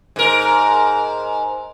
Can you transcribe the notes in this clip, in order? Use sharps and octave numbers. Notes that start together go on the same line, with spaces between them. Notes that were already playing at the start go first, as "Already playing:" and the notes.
G#2 A#4